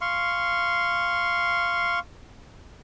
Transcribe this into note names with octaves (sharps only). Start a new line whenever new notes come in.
F5 C6 C#6